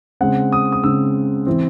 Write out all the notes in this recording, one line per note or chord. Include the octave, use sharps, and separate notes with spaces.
C#3 G#3 C4 F#5
D#6
D#6
C#3 G#3 C4 E6
E3 C4